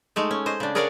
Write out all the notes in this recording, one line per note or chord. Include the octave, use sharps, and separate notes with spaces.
G#3 A3 D#4
C#4
C5 D#5
C#3 D4
G#4 A#4 C#5 D5 F5 F#5